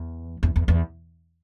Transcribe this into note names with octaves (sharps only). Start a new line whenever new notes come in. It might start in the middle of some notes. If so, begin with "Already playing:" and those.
Already playing: E2
E2
E2
E2